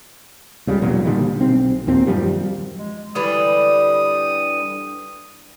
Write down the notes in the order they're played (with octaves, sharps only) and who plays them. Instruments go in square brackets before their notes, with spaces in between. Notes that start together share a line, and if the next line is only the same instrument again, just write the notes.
[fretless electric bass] C#2 C#3 F3 G3
B1 E2 A#2 F#3
A#2 D3 D#3 G3
B1 C4
D#2 A#2 C4
F#2 D#3 F3 G3
[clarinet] G#3
[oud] D3 E3 G3 [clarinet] D#6